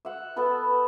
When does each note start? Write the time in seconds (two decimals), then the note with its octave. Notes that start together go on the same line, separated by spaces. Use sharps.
0.05 E5 F#5
0.36 B3 A4 B4